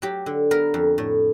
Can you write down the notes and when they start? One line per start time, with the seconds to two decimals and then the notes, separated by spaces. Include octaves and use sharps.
0.02 F#3 G4
0.26 D3
0.51 B3 A#4
0.74 F2
0.98 A2